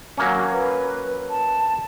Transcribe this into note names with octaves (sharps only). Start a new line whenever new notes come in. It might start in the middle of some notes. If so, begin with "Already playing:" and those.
F#3 A#3 C#4
B4
A5